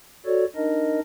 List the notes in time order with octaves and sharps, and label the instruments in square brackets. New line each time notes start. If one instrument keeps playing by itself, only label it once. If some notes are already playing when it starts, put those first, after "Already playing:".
[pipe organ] F#4 A4 C#5 D5
D4 D#4 A#4 D#5